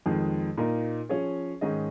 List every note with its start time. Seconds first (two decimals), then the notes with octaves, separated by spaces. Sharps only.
0.06 F2 D#3 G#3
0.58 A#2 A#3 D#4 A#4
1.09 F3 C#4 G#4 C#5
1.61 G#2 D#3 C#4 G#4 D#5